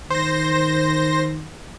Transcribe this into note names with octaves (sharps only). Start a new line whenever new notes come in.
D#3 C5 A#6